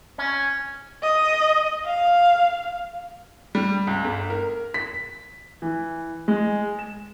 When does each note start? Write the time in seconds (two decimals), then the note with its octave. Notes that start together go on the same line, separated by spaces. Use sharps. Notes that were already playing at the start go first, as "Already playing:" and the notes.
0.18 C#4
1.03 D#5
1.85 F5
3.55 G3
3.87 C#2
4.04 G1
4.30 A#4
4.74 B6
5.62 E3
6.28 G#3
6.79 E7